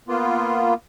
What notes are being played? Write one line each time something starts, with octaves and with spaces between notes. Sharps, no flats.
A#3 B3 F4